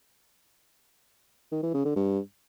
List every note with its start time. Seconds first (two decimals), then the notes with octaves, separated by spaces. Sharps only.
1.52 D#3
1.63 E3
1.74 C#3
1.85 D3
1.96 G2